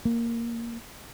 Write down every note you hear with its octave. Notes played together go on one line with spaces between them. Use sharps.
A#3